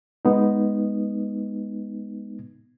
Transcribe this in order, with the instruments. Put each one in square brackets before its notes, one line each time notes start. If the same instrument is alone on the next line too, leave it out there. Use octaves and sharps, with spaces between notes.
[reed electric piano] G#3 B3 D#4